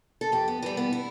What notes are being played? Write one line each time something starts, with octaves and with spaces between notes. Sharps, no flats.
A4
F2 G4
B3
E3 G3 B3
B3
E4